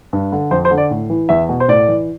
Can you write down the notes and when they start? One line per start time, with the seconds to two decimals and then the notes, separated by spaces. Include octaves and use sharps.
0.13 G2
0.32 D3
0.51 F2 C5
0.65 C5
0.71 D3
0.78 D5
0.91 A2
1.10 E3
1.29 E2 E5
1.49 B2
1.60 C5
1.68 A2 D5
1.88 E3